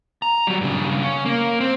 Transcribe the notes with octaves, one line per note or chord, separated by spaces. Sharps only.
A#5
F#3 G3
G2 C#3
C#4
A#3
C4